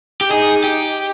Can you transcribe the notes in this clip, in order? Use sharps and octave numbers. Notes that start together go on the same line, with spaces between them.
G4
D#4 G#4
G4